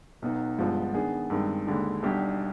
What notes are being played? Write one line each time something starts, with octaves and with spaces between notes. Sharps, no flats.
B1 B2 B3 D#4 B4
G1 G2 F3 G#3 B3
D#3 B3 D4 G#4
G2 D#3 G#3 C4
D#2 D3 G#3 D4
B1 B2 G3 D4 G4